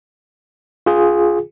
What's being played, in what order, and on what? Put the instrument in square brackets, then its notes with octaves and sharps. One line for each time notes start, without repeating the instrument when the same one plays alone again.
[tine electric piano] F4 G#4